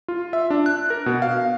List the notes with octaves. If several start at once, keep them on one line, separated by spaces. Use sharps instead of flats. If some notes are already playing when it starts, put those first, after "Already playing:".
F4
E5
D4
F#6
A#4
B2
F5